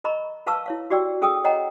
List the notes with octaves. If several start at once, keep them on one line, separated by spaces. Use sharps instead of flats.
A#4 D#5 A#5 B5 C#6
A#4 B4 F5 A5 C#6 E6
E4 C#5 F5
F#4 G4 D5 G5 E6
C#4 G#4 A4 G5 D#6 E6
C#5 D#5 F#5 G5 A#5